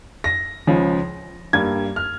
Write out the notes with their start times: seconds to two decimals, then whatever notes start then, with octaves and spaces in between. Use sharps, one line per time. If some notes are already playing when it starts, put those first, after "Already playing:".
0.24 A#6
0.67 C#2 C#3 F3
1.53 G2 G3 A#3 G#6
1.96 F6